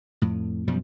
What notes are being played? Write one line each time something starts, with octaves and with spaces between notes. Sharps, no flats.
F2 A2
F#2 B2 F3 G3